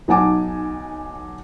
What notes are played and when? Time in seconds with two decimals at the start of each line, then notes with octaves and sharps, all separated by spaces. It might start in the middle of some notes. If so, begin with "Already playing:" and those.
0.08 B1 D#4 F#5 G#5 A5 D6